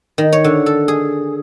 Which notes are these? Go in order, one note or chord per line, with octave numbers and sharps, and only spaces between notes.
D#3
C#5
D3
A4
G#4